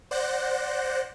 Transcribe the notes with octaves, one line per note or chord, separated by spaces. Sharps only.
C5 D5 F#5 F#6 G6 A#6